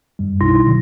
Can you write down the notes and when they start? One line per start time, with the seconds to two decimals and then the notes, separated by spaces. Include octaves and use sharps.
0.19 F#2 G3
0.41 B1 B2 D#4 E4 C6 A#6
0.67 B2 D3 F#3